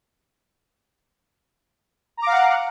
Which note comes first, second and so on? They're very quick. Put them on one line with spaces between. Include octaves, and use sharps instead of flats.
A#5 D6 F5 F#5